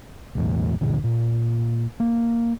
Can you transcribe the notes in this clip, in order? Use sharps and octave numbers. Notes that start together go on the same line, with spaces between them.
B1 E2 A2
C#2 F#2 A#2 D3
A#2
A#3